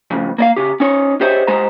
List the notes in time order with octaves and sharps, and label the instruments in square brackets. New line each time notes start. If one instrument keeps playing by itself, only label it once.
[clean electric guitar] F2 A2 C#3
A#3 D5 F5
C#3 G4
C#4 D#4 C#5
G4 G#4 C5 C#5 D#5 E5
G#3 G4 C5 D#5 A#5